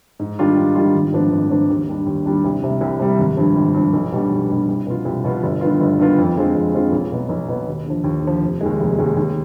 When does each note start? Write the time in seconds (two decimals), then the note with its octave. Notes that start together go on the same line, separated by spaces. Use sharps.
0.19 G#2
0.39 D#3 G3 D4 F4
0.57 G#2
0.75 D#3 G3 D4 F4
0.95 G#1
1.12 G#2 F3 B3 D4
1.32 G#1
1.50 G#2 F3 B3 D4
1.70 D#2
1.88 D#3 G3 D4
2.06 D#2
2.26 D#3 G3 D4
2.44 C2
2.62 C3 G3
2.81 C2
3.00 C3 G3
3.19 G#1
3.37 G2 F3
3.56 G#1
3.74 G2 F3
3.93 B1
4.12 B2 G3 D4
4.31 B1
4.49 B2 G3 D4
4.68 C2
4.86 B2 B3 F4
5.05 C2
5.24 B2 B3 F4
5.43 G1
5.61 G2 D#3 B3 F4
5.81 G1
5.99 G2 D#3 B3 F4
6.18 F2
6.36 D3 G#3 C4 F4
6.55 F2
6.74 D3 G#3 C4 F4
6.92 B1
7.12 B2 B3 D#4
7.29 B1
7.48 B2 B3 D#4
7.68 D#2
7.86 D3 F3
8.04 D#2
8.23 D3 F3
8.42 F1
8.61 D#2 D#3 G#3
8.80 F1
8.98 D#2 D#3 G#3
9.17 D#2